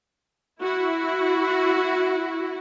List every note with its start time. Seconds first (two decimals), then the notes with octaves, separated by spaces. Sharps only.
0.62 E4 F#4